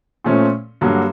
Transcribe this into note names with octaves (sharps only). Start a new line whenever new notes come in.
A#2 F3 A3 C#4
G2 D3 F#3 A#3